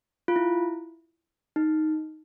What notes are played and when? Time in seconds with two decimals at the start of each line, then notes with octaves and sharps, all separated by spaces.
0.28 F4
0.36 E4
1.56 D#4